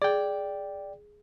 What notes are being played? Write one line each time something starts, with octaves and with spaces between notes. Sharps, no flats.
G#4 D5 G5